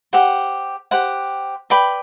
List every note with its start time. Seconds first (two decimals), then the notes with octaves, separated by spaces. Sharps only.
0.13 G4 C5 F#5
0.91 G4 C5 F#5
1.70 B4 D5 G5 B5